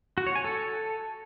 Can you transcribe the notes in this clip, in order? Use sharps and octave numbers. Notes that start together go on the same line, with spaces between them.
F#4
C#5
G#5
A4